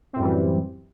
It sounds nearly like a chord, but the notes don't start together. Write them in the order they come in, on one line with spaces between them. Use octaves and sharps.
C4 A2 F#2 G3 E3